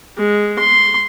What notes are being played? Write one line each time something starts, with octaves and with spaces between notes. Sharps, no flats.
G#3
C6